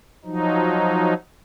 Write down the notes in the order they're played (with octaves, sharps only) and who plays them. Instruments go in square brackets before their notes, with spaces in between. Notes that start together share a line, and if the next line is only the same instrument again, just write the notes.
[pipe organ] F3 F#3 D#4